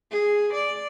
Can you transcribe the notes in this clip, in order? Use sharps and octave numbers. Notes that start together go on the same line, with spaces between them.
G#4
D5